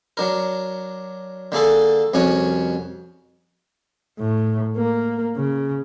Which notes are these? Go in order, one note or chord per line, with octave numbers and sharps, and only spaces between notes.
F#3 D4 A#4
D3 A#3 G#4 A4
C2 F2 C#4 F#4 C#5
A2
A#3
C#3